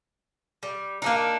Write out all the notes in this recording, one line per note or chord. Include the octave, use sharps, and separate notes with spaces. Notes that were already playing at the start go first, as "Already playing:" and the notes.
G3
A#3 D4 D#4